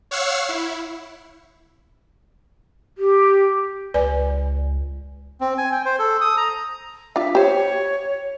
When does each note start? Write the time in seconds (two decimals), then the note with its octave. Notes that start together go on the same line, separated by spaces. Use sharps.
0.11 C#5 F5 F#5 C#6 E6 C7
0.49 E4
2.98 G4
3.94 C#2 B4 D5 G#5
5.41 C4
5.58 G#5
5.72 G5
5.85 C5
5.99 A4
6.21 D#6
6.37 A#5
7.16 D4 F4 E5
7.35 G4 C5 C#5